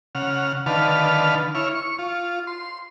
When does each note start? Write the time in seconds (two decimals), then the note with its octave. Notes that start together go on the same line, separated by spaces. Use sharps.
0.15 C#3 F#5 F6
0.66 D3 D#3 B4 F5 A5 F6
1.55 E4 C#5 F6
1.75 C#6
1.99 F4
2.47 C6